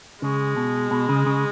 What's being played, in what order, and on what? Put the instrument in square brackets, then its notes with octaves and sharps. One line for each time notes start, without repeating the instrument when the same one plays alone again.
[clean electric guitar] C#3 [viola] G#3
[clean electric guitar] B2
B2
C#3
C#3